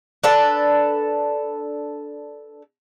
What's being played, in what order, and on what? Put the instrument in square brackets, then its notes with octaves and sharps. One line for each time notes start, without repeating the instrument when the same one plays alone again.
[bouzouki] D4 A4 B4